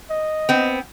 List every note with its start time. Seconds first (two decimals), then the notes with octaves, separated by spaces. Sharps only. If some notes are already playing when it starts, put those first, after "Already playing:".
0.10 D#5
0.49 B3 C4